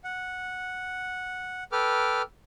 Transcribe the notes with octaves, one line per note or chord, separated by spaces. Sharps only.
F#5
A4 B4 G5 D6 F6